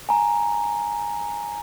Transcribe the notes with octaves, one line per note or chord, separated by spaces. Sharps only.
G#5 A#5